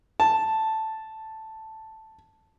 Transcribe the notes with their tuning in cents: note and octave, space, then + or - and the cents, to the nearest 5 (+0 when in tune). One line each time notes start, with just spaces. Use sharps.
A5 +0